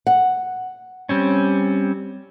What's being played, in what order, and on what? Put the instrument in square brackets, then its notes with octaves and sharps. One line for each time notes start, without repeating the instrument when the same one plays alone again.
[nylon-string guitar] F#5
[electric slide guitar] G3 C4 C#4